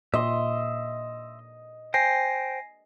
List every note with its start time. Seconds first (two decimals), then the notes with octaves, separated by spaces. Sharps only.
0.14 A#2 D#5 E5 C6
1.94 C5 G5 G#5 A#6 C7